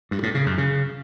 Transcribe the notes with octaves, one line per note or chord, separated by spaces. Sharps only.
G2
A2
C#3
F#2
C#3